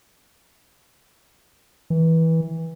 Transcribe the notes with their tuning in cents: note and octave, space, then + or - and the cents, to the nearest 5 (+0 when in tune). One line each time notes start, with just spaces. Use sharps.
E3 -20